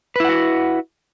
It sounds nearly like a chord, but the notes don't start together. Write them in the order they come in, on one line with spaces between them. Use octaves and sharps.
B4 E4 F#5 F#4